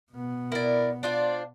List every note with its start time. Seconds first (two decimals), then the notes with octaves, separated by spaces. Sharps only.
0.12 B2 B3
0.52 E4 A#4 D5
1.03 D4 F4 C5 D5